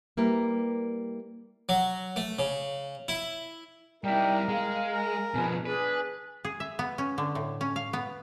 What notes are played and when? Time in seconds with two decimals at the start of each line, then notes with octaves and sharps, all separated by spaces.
0.17 G3 A#3 E4 A#4 B4
1.69 F#3
2.16 A3
2.39 C#3
3.08 E4
4.04 G3 D#4 E4 A#4 D5 G5
4.49 G#3 F5
4.92 A#4
5.34 B2 F3 G#4 B4 G#5
5.66 D4 G#4 B4
6.45 G#4
6.60 E5
6.79 B3
6.98 C#4
7.18 D3
7.35 A2
7.61 C#4
7.76 F5
7.93 B3